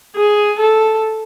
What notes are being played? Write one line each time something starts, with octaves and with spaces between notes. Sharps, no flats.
G#4
A4